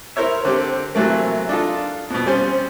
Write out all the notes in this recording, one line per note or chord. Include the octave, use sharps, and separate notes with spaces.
E4 A#4 C5 C#5 E5
D3 C4 G4
C3 E3 F#3 A3 A#3
D4 D#4 F4 A4
F2 B2
G3 C4 C#4 C5